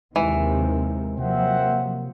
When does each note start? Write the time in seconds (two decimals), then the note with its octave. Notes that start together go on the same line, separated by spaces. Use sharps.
0.16 D#2 C3 D#3 E3 G#3
1.18 C3 F3 F#3 A#3 C4 E5 F#5